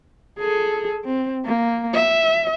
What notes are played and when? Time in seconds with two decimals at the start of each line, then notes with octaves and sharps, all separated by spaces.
0.38 G#4 A4
1.04 C4
1.46 A#3
1.94 E5